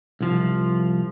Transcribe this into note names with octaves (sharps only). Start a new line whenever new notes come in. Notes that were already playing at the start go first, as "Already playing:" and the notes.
C2 F3